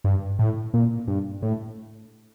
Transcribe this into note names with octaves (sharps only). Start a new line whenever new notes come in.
G2
A2
A#2
G2
A2